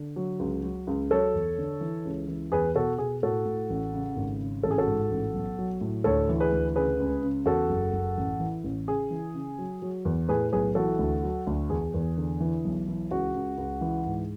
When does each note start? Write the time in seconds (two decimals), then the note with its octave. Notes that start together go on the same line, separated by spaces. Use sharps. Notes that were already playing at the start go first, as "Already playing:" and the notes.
Already playing: D3
0.16 F#3
0.39 C#2
0.63 F#3
0.87 C#2
1.10 F#3 A4 C#5
1.34 E2
1.58 D3
1.81 E3
2.05 C#2
2.28 E3
2.52 E2 G#4 B4
2.75 B2 F#4 A4
2.98 B2 G#4
3.23 A2 F#4 A4
3.45 A2
3.70 A1
3.94 C#3
4.16 G#1
4.40 C#3
4.63 A1 A4
4.71 G#4
4.78 F#4 A4
4.87 G#2
5.10 A1
5.34 B1
5.58 F#3
5.81 A2
6.04 D2 A4 C#5
6.29 E3
6.40 G#4 B4
6.52 D2
6.76 C#3 G#4 B4
6.99 C#2
7.22 C#3
7.46 E2 F#4 A4
7.69 F#1
7.93 F#1
8.17 A1
8.40 E3
8.64 A1
8.87 C#3 G#4
9.10 E3
9.34 C#3
9.59 F#3
9.82 F#3
10.05 E2
10.29 A2 G#4 B4
10.52 B1 G#4 B4
10.75 E3 F#4 A4
10.99 D2
11.23 F#3
11.47 D2
11.70 E2 G#4
11.94 E2
12.17 D3
12.40 E3
12.65 B1
12.88 E3
13.10 C#2 F#4
13.34 C#2
13.58 C#2
13.81 E3
14.06 G#2